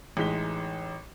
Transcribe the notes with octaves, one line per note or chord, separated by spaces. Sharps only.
A1 E3 G#3 D#4 B6 G7